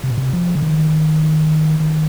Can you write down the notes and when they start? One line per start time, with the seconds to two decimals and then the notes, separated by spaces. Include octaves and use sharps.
0.03 C3
0.10 A#2
0.18 C3
0.33 F3
0.55 D3
0.62 D#3
1.80 D#3